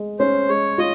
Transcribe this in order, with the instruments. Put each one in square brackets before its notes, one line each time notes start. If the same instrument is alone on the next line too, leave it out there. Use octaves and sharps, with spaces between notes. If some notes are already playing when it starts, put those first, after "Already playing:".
Already playing: [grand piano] G#3
[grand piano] C#4 [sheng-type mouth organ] C5
[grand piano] G#3 [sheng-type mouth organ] C#5
[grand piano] F4 [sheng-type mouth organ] D#5